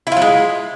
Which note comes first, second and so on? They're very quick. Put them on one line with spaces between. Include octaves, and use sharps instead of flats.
E4 F4 F#3 G#3